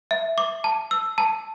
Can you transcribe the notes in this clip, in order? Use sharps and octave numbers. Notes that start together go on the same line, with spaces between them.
E5
D6
A5
E6
A5